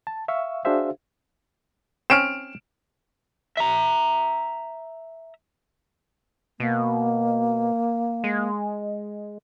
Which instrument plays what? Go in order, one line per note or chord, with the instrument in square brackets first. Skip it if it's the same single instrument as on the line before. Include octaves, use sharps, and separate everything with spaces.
[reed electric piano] A5
E5 F5 C#6 E6
D4 F#4 G#4 C5 E5 F5
[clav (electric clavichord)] C4 C#4 [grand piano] F6 D7 E7
[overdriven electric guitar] E5 A#5
[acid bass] B2 [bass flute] A#3
[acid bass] G#3